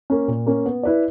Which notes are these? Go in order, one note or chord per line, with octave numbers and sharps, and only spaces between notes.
A#3 C#4
A#2
A#3 C#4
B3
E4 B4 D5